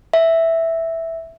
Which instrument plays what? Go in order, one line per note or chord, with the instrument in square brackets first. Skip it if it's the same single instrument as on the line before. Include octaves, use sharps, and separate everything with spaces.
[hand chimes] E5